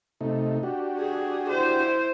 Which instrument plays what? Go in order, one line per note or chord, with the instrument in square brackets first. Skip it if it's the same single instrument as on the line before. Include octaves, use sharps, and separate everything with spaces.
[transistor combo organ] C3 A3 D#4
D4 F#4 G4
[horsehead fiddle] G#4
E4 C5